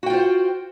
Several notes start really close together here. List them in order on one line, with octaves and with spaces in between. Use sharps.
F#4 G5 F4 C5